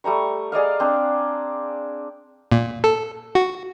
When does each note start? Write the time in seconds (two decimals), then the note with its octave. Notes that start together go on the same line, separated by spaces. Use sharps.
0.04 G3 A3 A#5 C#6
0.52 G#4 D5 D#5 F5
0.80 C4 D4
2.52 A#2
2.84 A4
3.35 F#4